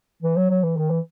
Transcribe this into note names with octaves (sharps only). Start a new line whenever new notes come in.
E3
F#3
F#3
E3
D#3
E3